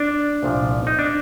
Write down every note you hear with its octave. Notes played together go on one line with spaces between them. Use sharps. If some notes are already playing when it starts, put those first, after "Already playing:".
Already playing: D4
C2 A#2 F3
D#4
D4